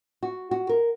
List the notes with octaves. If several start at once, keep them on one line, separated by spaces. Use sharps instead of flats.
F#4
F#4
A#4